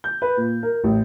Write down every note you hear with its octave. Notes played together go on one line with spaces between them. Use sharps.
G6
B4
A#2
A#4
A1